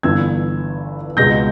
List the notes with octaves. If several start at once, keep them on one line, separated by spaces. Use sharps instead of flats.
G1 G2 E3 E6 G#6
C#2 B2 G#3 G6 A#6